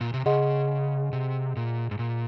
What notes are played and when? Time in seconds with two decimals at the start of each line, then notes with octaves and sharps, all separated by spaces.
0.01 A#2
0.14 C3
0.26 C#3 G#4 D#5 F#5 C6
1.13 C3
1.57 A#2
1.91 G#2
1.99 A#2